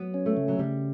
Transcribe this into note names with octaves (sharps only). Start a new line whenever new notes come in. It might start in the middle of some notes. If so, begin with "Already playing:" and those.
Already playing: F#3 B3
C#4
A3
C#3
F#3
C#3 G3